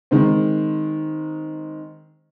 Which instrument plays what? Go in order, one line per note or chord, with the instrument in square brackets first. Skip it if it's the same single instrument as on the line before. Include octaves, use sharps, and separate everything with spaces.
[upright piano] D#3 G#3 C4